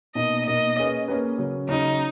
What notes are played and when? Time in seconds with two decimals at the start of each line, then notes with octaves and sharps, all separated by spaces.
0.15 B2 A#3 D#4 D#5
0.46 B2 A#3 D#4 D#5
0.76 A#3 C#4 G#4 B4
1.08 A#3 C#4 G#4 B4
1.38 C#3 F#3 C#4
1.69 C#3 F#3 C#4 D#4